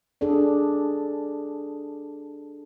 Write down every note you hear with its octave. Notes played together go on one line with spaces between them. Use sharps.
D4 G#4 A4 D5